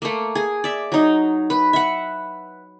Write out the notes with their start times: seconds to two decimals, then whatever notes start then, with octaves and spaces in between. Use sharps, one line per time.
0.02 A3 A#3
0.35 G#4
0.64 D5 E5
0.92 F#3 D#4
1.50 B4
1.73 E5 F#5